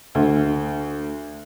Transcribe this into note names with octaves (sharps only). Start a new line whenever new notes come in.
D2